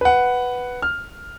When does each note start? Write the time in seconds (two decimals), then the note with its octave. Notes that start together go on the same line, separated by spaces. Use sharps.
0.01 B4 F#5
0.82 F6